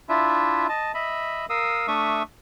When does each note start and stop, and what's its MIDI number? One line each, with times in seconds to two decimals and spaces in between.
0.09 0.67 62
0.09 0.67 64
0.09 0.67 65
0.09 0.67 76
0.69 0.92 75
0.69 0.92 81
0.94 1.46 75
0.94 1.46 76
0.94 1.46 83
1.50 1.87 70
1.50 1.87 77
1.50 1.87 87
1.50 1.87 88
1.88 2.23 57
1.88 2.23 62
1.88 2.23 76
1.88 2.23 85
1.88 2.23 87